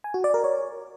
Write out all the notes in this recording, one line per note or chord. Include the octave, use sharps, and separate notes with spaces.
G#5
F#4
D5
A#4
C#5